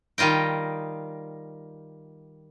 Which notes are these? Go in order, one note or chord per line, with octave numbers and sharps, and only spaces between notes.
D#3 G3 F4 D#5 G5